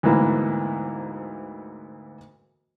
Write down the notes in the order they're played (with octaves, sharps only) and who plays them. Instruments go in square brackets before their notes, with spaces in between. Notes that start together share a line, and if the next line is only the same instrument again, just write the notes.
[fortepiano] D2 G#2 E3 A#3 B3